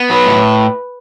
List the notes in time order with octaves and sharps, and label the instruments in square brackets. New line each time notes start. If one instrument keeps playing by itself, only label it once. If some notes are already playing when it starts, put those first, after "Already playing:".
Already playing: [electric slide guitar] B3
[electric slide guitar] F#3 [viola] B4
[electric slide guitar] A2